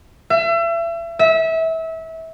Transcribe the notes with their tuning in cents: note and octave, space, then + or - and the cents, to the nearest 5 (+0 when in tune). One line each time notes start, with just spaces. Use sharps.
E5 +35
E5 -25